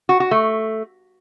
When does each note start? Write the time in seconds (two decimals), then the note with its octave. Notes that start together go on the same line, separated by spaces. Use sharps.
0.09 F#4
0.20 F#4
0.31 A3